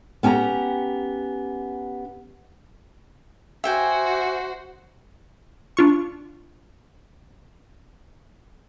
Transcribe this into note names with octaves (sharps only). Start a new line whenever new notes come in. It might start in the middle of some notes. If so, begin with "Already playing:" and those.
B3 C#4 G4 A5 A#5
F#4 C5 E5 G5 G#5
D4 F4 C#6